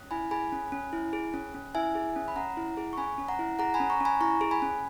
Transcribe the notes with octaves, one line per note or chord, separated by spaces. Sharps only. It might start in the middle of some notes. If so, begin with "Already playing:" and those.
Already playing: C#4
E4 G#5 B5
G#4 G#5 B5
C#4
C#4
E4
G#4
C#4
C#4
E4 E5 G#5
G#4
C#4
B5
C#4 F#5 A#5
E4
G#4
C#6
C#4 G#5 B5
C#4
F#5 A#5
E4
G#4 F#5 A#5
G#5 B5
C#4
A#5 C#6
C#4 G#5 B5
E4 A#5 C#6
G#4
G#5 B5
C#4